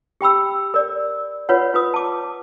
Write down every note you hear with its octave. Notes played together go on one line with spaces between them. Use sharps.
G4 G5 B5 E6
A#4 D5
F4 B4 C#5 F#5
F4 B4 D#6
A5 D6